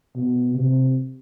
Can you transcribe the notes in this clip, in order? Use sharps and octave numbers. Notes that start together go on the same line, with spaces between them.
B2
C3